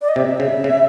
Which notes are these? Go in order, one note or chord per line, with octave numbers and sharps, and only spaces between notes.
D5
D#5
C3 E5
C#3
C#3